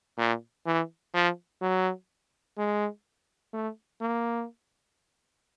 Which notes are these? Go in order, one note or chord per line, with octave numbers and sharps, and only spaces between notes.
A#2
E3
F3
F#3
G#3
A3
A#3